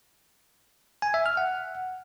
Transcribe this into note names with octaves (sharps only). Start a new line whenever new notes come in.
G#5
E5
F6
F#5